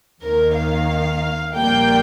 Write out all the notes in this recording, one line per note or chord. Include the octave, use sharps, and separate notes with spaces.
D#2 D#3 A#3 A#4
F5
A#1 A#2 G3 A#3 G5